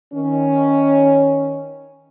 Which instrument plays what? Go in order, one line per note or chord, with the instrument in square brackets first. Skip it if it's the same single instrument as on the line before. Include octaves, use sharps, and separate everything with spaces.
[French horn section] D#3 C#4